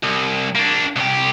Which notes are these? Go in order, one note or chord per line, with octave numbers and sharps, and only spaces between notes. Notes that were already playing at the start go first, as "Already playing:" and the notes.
C2
A#3 D4
C2 G4